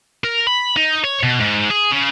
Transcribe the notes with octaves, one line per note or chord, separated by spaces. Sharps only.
A#4
B5
D#4
C#5
B2
G#2
G#4
C#3